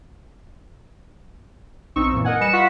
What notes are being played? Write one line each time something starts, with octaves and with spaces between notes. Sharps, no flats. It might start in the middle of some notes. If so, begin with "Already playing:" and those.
B1 C4 D#4 C#6 E6
F#2 A#2 E3
A#4 D#5 F#5 G#5
G3 B4 D#5 C#7 E7
F4 F#5 C#6 B6